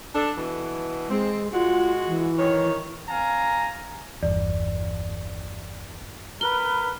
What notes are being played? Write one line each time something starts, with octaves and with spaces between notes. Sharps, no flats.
D4 A4
B2 E3
G#3 C4
G#3 F4 F#4
E3
D#3 C#5
C4 F5 G#5 A#5
G1 E2 D5
A#4 B4 G7